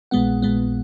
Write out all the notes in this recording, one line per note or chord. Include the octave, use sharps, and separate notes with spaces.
A#1 A#2 G#3 B3 F#5
A#1 A#2 G#3 B3